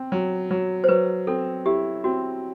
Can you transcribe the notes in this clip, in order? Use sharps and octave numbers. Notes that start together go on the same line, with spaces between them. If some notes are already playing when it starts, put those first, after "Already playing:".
Already playing: C4
F#3
F#3
C5
F#3 B4
C4 A4
E4 G4
C4 F#4